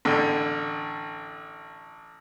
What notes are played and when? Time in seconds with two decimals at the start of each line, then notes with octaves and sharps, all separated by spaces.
0.05 A1 D3